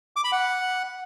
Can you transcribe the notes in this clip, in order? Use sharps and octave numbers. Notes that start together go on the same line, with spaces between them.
D6
B5
F#5